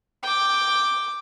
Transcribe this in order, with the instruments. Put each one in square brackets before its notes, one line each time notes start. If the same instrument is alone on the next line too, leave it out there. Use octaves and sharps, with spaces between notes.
[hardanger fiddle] G5 D6